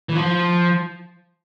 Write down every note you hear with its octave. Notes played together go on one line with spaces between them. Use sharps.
E3
F3